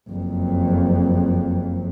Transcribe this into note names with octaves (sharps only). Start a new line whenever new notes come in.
F#1 F2